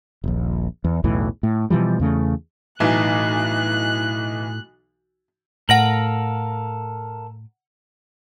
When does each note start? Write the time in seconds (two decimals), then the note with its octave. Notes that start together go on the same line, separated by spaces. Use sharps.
0.24 D#1 A#1
0.84 E2
1.04 B1 E2 A2 E3
1.43 A2
1.70 B2 E3 F3 G3
2.00 E2 C#3 A3
2.80 B1 A2 E3 D#4 F#6
5.69 A2 A4 A#4 F5 F#5 A#6 F#7